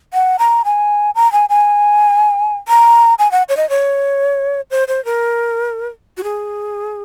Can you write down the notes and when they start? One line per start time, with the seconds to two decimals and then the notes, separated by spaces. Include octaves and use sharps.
0.14 F#5
0.39 A#5
0.65 G#5
1.15 A#5
1.32 G#5
1.49 G#5
2.68 A#5
3.19 G#5
3.31 F#5
3.49 C#5
3.57 D#5
3.70 C#5
4.71 C5
4.88 C5
5.05 A#4
6.17 F#4
6.23 G#4